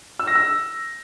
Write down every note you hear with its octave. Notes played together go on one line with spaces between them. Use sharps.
E6
A#6
E6